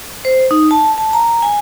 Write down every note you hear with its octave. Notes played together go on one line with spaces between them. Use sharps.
C5
D#4
A5
A5
A#5
G#5